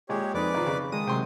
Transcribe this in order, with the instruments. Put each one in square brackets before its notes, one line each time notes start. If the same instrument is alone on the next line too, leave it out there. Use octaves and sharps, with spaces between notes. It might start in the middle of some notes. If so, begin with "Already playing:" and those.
[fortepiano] A#2 G#3 [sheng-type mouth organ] G4 C#5
[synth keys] F2 D#4 [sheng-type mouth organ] B4 D5 D6
[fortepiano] D#3 F3
C#3
[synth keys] D#3 G#3 D#7 [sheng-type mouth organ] D#6
[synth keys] C3 D#3 F#3 [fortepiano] G5 C6